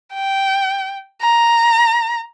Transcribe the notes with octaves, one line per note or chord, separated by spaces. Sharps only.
G5
A#5